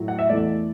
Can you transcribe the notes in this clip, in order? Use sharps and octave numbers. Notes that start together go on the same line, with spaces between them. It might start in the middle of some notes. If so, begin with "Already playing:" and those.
Already playing: A2 F#3 A3
F#5
E5
E2 E3 A3 D5